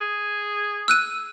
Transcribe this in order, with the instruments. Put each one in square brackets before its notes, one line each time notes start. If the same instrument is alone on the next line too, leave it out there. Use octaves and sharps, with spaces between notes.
[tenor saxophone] G#4
[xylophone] E6 F#6 D#7